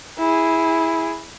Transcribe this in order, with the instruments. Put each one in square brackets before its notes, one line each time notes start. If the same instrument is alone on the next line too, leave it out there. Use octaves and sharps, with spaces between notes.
[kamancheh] E4 G#4